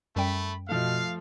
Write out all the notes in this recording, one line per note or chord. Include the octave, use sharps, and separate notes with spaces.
F#2 G3 A3 G5 B5
B2 F3 A3 F5